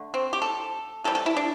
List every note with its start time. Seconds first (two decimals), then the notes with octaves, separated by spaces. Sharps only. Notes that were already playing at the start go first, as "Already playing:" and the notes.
Already playing: D3 A3
0.14 C4
0.33 G4
0.42 A4
1.04 C3 E3 G3 A4
1.15 A4
1.26 E4
1.37 D4